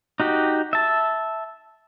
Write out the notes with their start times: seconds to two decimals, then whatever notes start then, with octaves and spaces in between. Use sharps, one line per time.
0.20 D#4 F#4 G4
0.73 E5 A5